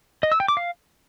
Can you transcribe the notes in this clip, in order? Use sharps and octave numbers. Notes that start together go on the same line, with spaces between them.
D#5
E6
G5
D6
F5